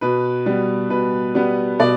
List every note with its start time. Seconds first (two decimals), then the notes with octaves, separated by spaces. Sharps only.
0.01 B2 B4
0.46 G3 B3
0.90 B2 B4
1.35 G3 B3
1.79 B2 D5